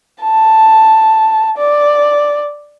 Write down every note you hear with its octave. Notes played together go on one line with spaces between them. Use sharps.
A5
D5